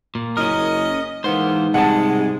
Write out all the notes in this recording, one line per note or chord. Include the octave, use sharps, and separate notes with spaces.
A#2
F#1 C#4 A#4 D#5
G#2 E3 A#3 B3 C5
C2 C3 G#3 F#5 A5